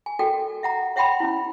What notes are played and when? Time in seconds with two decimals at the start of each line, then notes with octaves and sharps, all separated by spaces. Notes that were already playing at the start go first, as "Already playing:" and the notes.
0.06 G#5
0.19 F#4 A4 A#4 D5 G5
0.63 E5 F#5 A#5
0.96 C#5 E5 F#5 G5 B5 C6
1.20 C#4 E4